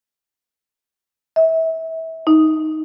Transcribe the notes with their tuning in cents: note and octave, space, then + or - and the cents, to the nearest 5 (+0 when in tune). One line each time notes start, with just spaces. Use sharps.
E5 -30
D#4 +5